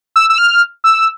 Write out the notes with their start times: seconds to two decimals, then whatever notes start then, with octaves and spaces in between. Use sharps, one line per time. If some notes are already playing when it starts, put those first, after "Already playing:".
0.16 E6
0.30 E6
0.38 F6
0.84 E6